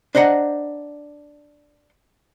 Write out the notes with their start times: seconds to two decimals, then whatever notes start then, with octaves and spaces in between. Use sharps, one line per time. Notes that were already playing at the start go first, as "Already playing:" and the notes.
0.15 D4 C5 D#5 F#5 A#5